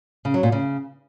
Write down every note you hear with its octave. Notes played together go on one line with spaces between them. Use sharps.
C#3
F#3
A#2
C#3